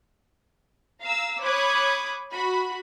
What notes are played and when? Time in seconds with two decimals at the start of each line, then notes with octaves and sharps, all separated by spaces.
1.00 F5 A#5 E6
1.41 C#5 B5 D6 D#6 F#6 G#6
2.33 F#4 B5